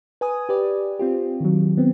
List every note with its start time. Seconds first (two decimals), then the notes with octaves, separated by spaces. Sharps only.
0.21 B4 G#5 D#6
0.49 G4 B4 D5
0.99 C4 F4 G4
1.40 D#3 F#3
1.78 B3 C4